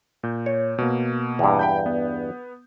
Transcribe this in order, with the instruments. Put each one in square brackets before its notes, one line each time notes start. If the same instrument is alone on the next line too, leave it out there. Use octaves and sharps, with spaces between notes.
[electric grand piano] A#2 G6
[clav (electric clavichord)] C#5
[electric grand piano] B2 A#3
[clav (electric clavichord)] E2 G2
[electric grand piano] G5 B5 G6
B3